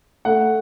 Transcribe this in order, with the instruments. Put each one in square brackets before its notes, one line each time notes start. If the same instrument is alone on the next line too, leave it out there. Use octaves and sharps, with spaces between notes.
[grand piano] A3 F#5